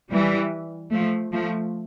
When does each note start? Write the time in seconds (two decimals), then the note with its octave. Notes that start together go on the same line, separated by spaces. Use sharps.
0.11 E3 G3
0.92 F3 A3
1.32 F3 A3